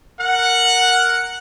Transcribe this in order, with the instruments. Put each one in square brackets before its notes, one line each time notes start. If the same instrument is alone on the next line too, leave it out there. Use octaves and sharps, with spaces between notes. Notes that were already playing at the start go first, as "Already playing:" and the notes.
[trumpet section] A#4 F#5